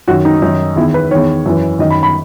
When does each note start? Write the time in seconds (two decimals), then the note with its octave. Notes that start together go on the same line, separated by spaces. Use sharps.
0.08 F#2 D#3 F#4
0.25 D#4
0.42 F#2 D#3 D#4
0.76 E2 D#3 E4
0.94 B4
1.11 E2 D#3 C#5
1.46 F#2 E3
1.79 F#2 D#3 D#5
1.91 B5
2.03 B5